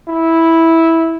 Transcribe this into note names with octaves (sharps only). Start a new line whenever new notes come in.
E4